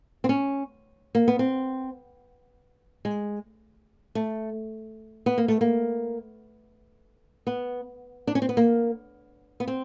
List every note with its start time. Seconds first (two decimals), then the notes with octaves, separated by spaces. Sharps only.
0.24 C4
0.29 C#4
1.15 A#3
1.28 B3
1.39 C4
3.05 G#3
4.15 A3
5.26 B3
5.38 A#3
5.48 A3
5.61 A#3
7.47 B3
8.27 D4
8.35 C#4
8.42 C4
8.49 B3
8.57 A#3
9.60 B3
9.67 C4